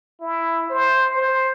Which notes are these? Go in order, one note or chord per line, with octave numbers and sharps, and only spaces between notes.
E4
C5
C5